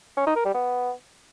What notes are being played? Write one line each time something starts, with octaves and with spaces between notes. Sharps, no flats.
C#4
D#4
A#4
G3
B3